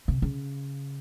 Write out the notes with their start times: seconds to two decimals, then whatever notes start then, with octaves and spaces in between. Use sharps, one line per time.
0.08 C3
0.22 C#3